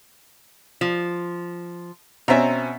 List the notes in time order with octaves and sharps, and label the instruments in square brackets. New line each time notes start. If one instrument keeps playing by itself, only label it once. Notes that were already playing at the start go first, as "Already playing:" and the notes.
[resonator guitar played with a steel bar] F3
[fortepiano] B2 C4 C#4 [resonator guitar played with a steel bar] E5 A#5